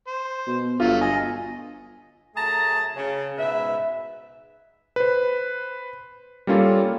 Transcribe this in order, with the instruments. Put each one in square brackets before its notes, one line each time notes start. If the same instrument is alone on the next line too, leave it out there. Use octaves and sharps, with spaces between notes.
[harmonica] C5
[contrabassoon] B2
[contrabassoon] G1 [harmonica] F#3 A3 [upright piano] F4
[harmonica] D#5 [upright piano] G#5
[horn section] F#2 A3 G#4 A5 A#5
C#3
G#2 B2 B4 E5
[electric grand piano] B4 C5
G3 A#3 C#4 F4 A4